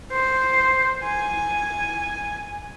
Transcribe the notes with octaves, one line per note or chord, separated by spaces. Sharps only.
C5
G#5